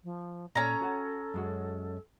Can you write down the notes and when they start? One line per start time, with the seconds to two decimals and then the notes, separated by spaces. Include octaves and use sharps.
0.04 F3
0.55 A#2 C#4 A4 D5 A#5 B5
0.81 F#4 F#5 A5
1.34 F#2 G#3 F#4